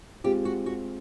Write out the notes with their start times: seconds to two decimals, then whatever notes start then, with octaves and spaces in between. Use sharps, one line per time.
0.24 G#3 C4 F4 G4
0.45 F#4
0.66 F#4